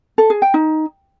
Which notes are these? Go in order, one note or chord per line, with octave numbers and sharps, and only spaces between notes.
A4
G#4
G5
D#4